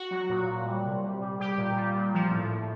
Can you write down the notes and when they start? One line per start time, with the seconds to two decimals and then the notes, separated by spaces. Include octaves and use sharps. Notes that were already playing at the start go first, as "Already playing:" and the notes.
Already playing: F#4
0.11 F#3
0.30 A#2
0.48 A#2
0.66 G3
0.85 C3
1.04 G3
1.21 G3
1.40 G3 G4
1.58 A#2
1.76 G3
1.95 A#2
2.14 F3
2.31 A2
2.49 A2